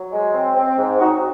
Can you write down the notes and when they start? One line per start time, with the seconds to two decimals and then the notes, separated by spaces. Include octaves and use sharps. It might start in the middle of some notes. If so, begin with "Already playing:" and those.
Already playing: F#3
0.12 G#3
0.33 C4
0.56 C4
0.77 G#2
0.98 C4 D#4 F#4